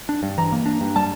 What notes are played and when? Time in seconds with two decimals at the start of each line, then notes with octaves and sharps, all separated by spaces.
0.09 D4
0.23 G2
0.38 E3 A#5
0.52 A#3
0.66 D4
0.81 G2
0.96 G3 A5